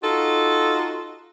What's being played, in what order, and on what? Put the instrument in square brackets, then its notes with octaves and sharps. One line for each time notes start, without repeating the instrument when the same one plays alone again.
[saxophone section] D#4 F4 F#4 A4